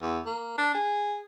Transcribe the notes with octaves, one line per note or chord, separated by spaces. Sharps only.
E2
A#3
D4
G#4